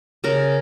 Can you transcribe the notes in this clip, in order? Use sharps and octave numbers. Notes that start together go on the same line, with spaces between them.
C#3 A#4